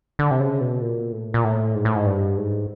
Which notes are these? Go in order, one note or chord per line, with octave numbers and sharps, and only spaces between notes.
D3
C3
C#3
B2
A#2
A2
A#2
A2
G#2
A2
G#2
G2
G#2